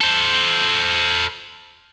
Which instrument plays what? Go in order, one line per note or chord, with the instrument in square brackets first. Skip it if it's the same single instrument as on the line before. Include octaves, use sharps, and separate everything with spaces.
[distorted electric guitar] A4 C5